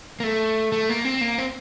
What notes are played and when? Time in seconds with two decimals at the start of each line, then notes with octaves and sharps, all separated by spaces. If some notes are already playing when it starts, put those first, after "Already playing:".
0.20 A#3
0.24 A3
0.72 A3
0.89 A#3
1.05 C4
1.21 A#3
1.38 C4